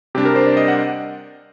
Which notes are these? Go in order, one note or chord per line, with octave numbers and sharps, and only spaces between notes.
C3 G3 D4 G4
A#4
C5
D5
D#5
F#5